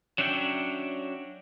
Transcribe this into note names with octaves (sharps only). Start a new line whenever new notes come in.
F#3 C#4 D4 E5 G5